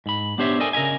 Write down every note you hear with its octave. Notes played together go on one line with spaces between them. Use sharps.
G#2 B5
B3 D4 G4 C5 C#5 E5
A4 A#4 D5 D#5 G5 G#5
C#3 A#4 D#5 E5 G#5